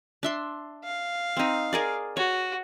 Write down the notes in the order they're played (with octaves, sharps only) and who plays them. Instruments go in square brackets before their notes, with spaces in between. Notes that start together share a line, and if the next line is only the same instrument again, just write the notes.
[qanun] D4 E5 C6
[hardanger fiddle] F5
[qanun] C4 D#4
G#4 A#4 D5
[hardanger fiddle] F#4 [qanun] C#5